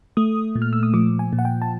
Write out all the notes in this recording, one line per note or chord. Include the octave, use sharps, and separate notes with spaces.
A3 D#6
A#2
F6
E6
D#6
F3 D6
G#5
A#2
F#5
G5
A5